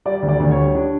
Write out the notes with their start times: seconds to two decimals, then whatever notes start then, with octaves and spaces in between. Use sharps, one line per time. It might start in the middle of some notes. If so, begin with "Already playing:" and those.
0.05 G3 D5
0.23 D2
0.29 D5
0.40 D2
0.51 C#5
0.58 G3
0.75 D4